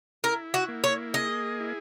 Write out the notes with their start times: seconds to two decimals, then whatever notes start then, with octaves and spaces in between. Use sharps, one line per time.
0.24 E4 A#4
0.54 F#4
0.68 A#3
0.84 C#5
1.14 G#4 D#5
1.60 E4